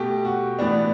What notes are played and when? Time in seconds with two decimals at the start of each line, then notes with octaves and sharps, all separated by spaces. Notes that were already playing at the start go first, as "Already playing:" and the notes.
Already playing: B2 A3 G4
0.25 F#4
0.59 A2 E3 B3 D4